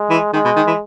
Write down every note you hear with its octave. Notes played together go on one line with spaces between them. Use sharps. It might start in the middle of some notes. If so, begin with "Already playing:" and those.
Already playing: G#3
E3
D#3 G#3
B2
D#3
E3